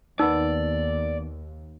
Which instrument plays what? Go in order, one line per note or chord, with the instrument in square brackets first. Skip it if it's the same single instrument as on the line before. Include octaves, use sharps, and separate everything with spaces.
[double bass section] D#2 [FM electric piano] D#3 B3 [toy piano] D#4 E6 [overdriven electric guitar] D5